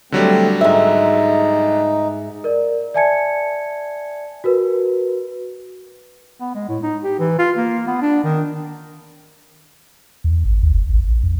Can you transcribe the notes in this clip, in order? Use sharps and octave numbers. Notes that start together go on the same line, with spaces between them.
D3 F#3 G3 A3 C4
G#2 D#4 E5
A#4 D5
D5 E5 G#5 A5 G#6 C#7
F#4 A#4 B4
B3
G#3
A2
D#4
G4
E3
F4
A#3
B3
D4
D#3
E2
G#1
D#2
F#1
A1
A1
F2